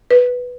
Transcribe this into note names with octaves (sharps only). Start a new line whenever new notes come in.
B4